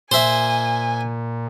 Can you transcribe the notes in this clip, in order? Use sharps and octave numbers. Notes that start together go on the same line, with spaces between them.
A#2 C5 E5 G#5